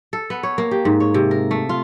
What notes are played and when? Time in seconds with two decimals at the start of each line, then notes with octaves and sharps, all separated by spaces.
0.13 A4
0.30 B3
0.43 C#5
0.58 A#3
0.71 G4
0.85 G#2
1.00 C#5
1.14 C3
1.31 A#4
1.51 A3
1.69 F4